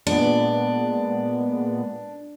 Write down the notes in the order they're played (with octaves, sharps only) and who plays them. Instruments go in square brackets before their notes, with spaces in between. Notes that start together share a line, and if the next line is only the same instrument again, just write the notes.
[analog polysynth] A#2 G#3 B3 [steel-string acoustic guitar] D4